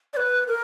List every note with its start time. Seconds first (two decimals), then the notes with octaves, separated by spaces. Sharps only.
0.13 D5
0.17 B4
0.48 A#4